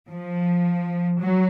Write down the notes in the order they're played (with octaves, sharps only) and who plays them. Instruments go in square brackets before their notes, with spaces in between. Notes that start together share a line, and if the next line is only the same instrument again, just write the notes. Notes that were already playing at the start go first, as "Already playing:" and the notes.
[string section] F3
F#3